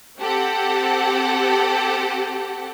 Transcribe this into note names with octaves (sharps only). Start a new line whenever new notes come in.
C4 G4 A4 F#5